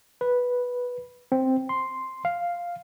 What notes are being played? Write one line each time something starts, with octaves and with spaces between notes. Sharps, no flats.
B4
C4
C6
F5